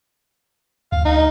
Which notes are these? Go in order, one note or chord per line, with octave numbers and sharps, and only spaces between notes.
D2 F5
D#4